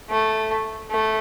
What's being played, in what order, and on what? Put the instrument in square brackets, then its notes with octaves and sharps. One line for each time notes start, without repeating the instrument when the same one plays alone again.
[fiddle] A3
A3